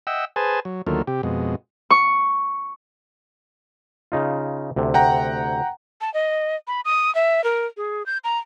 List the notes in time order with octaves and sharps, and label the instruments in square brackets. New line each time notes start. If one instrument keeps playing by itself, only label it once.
[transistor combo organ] D#5 E5 F#5 G5 E6
G#4 B4 C5 G#5 A5
F#3
D2 D#3 F#3 A3 A#3 F4
C3 G4
F2 B2 G#3
[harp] C#6
[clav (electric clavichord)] C#3 D#4 F4
D2 C3
[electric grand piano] F#5 G5 A#5
[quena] A5
D#5
B5
D#6
E5
A#4
G#4
G6
A#5